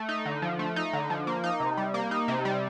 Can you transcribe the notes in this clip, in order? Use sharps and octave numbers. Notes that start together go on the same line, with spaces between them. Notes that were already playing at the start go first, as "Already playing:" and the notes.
Already playing: A3
D#4
D3
F3
A3
D#4
D3
F3
A#3
D#4
C3
G3
A#3
D#4
C3
G3